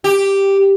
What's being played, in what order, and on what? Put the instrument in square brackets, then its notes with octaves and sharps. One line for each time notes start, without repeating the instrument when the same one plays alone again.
[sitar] G4